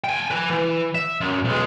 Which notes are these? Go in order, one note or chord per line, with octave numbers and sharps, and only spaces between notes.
G5 G#5
B4 G#5
E3
E5
F#2
B1 G#3